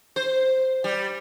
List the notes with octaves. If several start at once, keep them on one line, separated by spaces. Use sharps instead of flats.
C5
G3